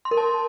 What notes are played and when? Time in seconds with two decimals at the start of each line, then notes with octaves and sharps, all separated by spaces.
0.05 C6
0.11 A#4
0.17 A5